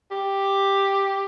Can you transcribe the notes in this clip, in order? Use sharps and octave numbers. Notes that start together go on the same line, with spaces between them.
G4